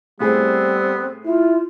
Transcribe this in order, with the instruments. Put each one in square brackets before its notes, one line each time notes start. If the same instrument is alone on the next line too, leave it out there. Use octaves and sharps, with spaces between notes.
[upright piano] A2 G#4 [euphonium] G3 [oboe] B3 [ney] C4
[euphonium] E4 [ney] F4